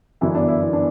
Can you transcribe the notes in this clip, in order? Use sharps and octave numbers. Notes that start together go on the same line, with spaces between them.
G1 F#2 E3 B3 E4
D4
E4
E4
D4